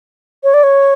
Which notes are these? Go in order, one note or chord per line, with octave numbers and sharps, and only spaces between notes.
C#5
D5
C#5